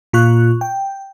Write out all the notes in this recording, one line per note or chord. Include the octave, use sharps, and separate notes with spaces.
A#2 F4 C#6 F#6
G5